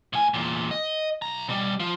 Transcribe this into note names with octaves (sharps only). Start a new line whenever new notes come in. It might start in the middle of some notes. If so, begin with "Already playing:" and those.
A2 G#5
E2 A#2
D#5
B1 A#5
B2 G3
F3 F4